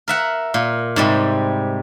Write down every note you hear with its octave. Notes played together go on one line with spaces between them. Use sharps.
A#4 E5 F#5
A#2
G#2 C3 G3